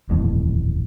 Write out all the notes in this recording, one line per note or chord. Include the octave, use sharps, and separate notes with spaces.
D#1 A1 F2 A2